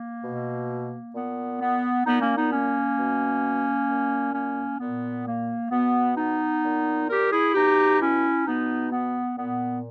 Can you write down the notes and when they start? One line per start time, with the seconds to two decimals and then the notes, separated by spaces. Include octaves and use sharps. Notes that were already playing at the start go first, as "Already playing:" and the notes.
Already playing: A#3
0.22 B2
1.13 A#2 B3
1.59 B3
2.05 A#2 B3 D#4
2.20 A#3 C#4
2.35 B3 D#4
2.51 A#3 C#4
2.97 B2
3.89 A#2
4.33 A#3 C#4
4.79 A#2 B3
5.26 A#3
5.71 B2 B3
6.16 B3 D#4
6.63 A#2
7.09 G4 A#4
7.31 E4 G#4
7.54 B2 D#4 G4
7.99 C#4 E4
8.46 B2 B3 D#4
8.91 B3
9.37 A#2 B3